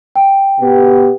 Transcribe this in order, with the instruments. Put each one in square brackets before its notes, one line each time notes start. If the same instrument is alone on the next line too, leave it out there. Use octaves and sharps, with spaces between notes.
[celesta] G5
[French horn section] B2 B3 G4